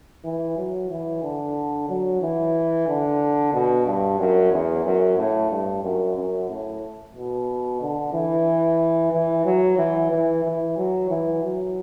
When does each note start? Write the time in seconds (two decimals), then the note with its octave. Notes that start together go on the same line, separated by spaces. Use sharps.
0.25 E3
0.57 F#3
0.90 E3
1.23 D3
1.89 F#3
2.22 E3
2.88 D3
3.54 B2
3.86 G2
4.19 F#2
4.52 E2
4.85 F#2
5.18 A2
5.51 G2
5.83 F#2
6.16 F#2
6.50 A2
7.15 B2
7.81 D3
8.14 E3
9.13 E3
9.45 F#3
9.78 E3
10.11 E3
10.44 E3
10.77 F#3
11.10 E3
11.43 F#3